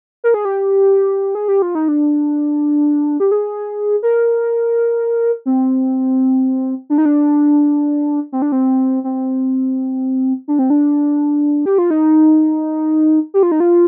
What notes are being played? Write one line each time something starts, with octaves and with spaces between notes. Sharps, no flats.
A#4
G#4
G4
G#4
G4
F4
D#4
D4
G4
G#4
A#4
C4
D4
D#4
D4
C4
D4
C4
C4
D4
C4
D4
G4
F4
D#4
G4
F4
D#4
F4